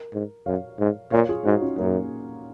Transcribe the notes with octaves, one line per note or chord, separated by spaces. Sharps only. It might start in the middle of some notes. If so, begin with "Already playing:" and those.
Already playing: A#4
G#2
F#2 C#5 F5
G#2
A#2 C#5 F5
F4 G#4
G#2 D#4 F#4
C#4 F4
F#2 A#3 C#4